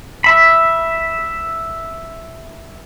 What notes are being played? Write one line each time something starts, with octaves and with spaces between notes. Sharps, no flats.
E5 B5